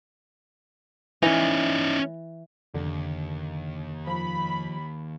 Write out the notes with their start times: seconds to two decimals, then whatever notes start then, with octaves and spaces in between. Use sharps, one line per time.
1.23 E3 C#4 D#4
2.74 F1 D#2 D3
4.07 F3 B5